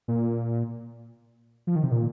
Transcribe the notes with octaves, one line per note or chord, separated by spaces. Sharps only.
A#2
F3
D#3
C3
A#2